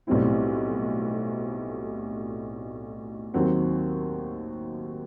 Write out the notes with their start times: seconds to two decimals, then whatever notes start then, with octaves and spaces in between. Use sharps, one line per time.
0.07 B1 A2 G3 C4 E4
3.34 D#2 D#3 F#3 C4